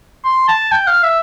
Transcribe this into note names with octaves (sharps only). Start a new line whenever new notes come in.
C6
A5
G5
F5
E5